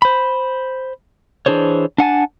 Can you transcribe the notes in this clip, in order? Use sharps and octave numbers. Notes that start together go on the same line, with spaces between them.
C5 B5
E3 D4 G#4 C5 C#5
D4 F#5 G#5 A5